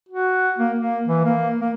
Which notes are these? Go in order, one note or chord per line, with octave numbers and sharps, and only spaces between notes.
F#4
A#3
A#3
E3
A#3
A#3